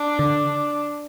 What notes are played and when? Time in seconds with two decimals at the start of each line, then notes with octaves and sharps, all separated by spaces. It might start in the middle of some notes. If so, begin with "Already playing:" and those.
Already playing: D4
0.19 D3